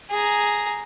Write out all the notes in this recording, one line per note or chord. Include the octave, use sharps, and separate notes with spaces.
G#4 A#5